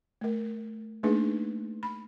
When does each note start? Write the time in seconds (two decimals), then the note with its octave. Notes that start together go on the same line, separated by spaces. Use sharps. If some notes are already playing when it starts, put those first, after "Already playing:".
0.21 A3 A#4
1.03 A3 A#3 D4 D#4 G#4 B4
1.83 B5